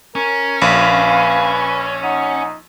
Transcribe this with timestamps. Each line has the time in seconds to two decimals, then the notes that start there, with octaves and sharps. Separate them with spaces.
0.15 C#4 A#4
0.62 A#1 B4 F5
2.03 D#4 F#5